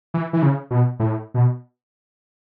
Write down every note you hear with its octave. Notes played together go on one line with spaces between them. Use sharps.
E3
E3
C#3
B2
A2
B2